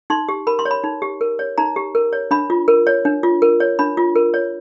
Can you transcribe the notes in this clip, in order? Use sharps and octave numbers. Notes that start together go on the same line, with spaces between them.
D#4 C6
G4
A#4 B5
C6
C#5
B5
D#4
G4
A#4
C#5
D#4 A#5
G4
A#4
C#5
D4 B5
F4
A#4
C#5
D4
F4
A#4
C#5
D4 B5
F4
A#4
C#5